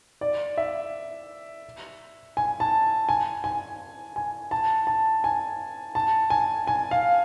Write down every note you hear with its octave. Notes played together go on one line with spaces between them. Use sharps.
D5
E5
G#5
A5
G#5
G#5
G#5
A5
A5
G#5
A5
G#5
G#5
F5